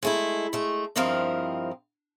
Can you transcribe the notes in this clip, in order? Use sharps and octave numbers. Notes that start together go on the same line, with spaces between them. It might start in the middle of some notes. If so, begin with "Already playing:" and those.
G#3 A3 E4
G#3 A3
G2 F3 C4 E4 A#4 D#5